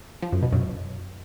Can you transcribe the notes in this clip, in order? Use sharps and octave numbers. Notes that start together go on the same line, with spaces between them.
F3
F#2
B2
F#2